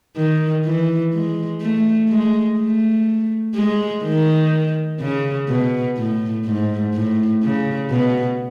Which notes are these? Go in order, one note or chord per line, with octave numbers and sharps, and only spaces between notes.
D#3
E3
G#3
A3
G#3
A3
G#3
D#3
C#3
B2
A2
G#2
A2
C#3
B2